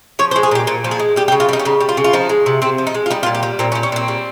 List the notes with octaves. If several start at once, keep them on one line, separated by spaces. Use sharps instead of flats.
F3 C#5
C5
G#3
G#4
A#2 G4
A#2 F4
F3
G#4
G#3
G3 G4
G4
C#3
F4
G3 D#4
C#4
C#3 D#4
G3
F4
C#3
F4
F3 D#4
G#3
C3
C3 C4
F3
D#4
G#3
F4
G3 D#4
F4
A#2
G4
G3
A#2 C4
C#4
G3
C#4
A#2 C4
G3